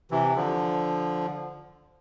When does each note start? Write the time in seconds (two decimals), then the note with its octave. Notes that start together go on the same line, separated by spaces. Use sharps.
0.11 C3 E3
0.36 D3 F3